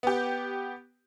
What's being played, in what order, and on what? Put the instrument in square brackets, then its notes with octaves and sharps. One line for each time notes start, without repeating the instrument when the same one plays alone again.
[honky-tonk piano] B3 G4